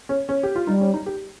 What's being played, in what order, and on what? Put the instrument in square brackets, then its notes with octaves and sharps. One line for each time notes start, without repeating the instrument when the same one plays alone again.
[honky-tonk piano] C#4
C#4
G4
F4
[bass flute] G3 [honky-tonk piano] D#4
[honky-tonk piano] C#4
D#4
G4